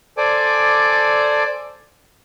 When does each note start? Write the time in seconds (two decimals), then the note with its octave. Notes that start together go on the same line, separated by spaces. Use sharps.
0.17 A4 C5 D5 G#5 D6